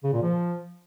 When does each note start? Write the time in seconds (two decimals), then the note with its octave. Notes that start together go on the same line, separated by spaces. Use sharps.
0.04 C#3
0.13 A#2
0.23 F3